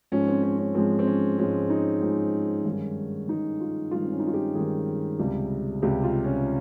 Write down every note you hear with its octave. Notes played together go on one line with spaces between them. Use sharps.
G#2 F3 G#3 C#4
C4
C#4
C#4
G#2 F3 G#3 C4
C4
C#4
G#2 F3 G#3 C#4
D#4
G#2 F3 G#3 C#4
G2 D#3 G#3
G2 D#3 G#3 D#4
F4
G2 D#3 G#3 F4
C4
C#4
D#4
F4
G4
G2 D#3 G#3 G#4
C#2 C3 G3
C#2 C3 G3 G4
F4
C#4